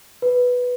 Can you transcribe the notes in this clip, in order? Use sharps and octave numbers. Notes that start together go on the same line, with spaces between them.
B4